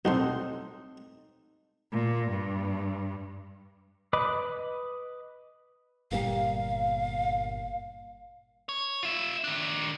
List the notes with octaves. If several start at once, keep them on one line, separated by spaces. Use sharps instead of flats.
B1 A2 C4 D#4 A4 C5 F#5
A#2
G2
B4 D#5 B5 D6
G1 A#2 G3 F5
C#5
F4 E5
D#3 D4